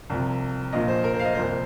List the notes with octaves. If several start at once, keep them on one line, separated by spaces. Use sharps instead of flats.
C2 C3 F3
A#1 A#2 F3 D#5
C5
A#4
C5
F5
D#5
C2 A#2 F3 C5